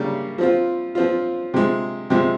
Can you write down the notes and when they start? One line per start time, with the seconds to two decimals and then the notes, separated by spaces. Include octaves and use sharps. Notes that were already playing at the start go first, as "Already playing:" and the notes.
Already playing: C#3 G3 A#3
0.38 F3 C4 F4
0.95 F3 C4 F4
1.54 C3 F3 G#3
2.10 C3 F3 G#3